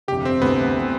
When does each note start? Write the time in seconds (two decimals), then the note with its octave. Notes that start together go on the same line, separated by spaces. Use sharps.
0.08 G1 F2 C3 G4
0.25 C4
0.42 D2 C3 E3 B3
0.79 E3